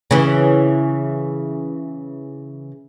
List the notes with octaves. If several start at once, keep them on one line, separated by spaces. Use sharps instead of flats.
C#3 E3